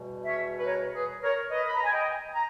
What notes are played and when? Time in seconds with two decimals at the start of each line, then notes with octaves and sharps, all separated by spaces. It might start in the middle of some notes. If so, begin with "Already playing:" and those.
Already playing: E2 B2 G3
0.24 C#5 E5
0.59 B4
0.67 A#4 C#5
0.95 G#4 B4
1.22 A#4 C#5
1.50 B4 D#5
1.68 B5
1.76 A#5
1.84 G#5
1.92 D#5 G5
2.34 A#5